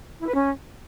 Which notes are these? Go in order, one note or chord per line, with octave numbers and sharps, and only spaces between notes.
E4
B4
C#4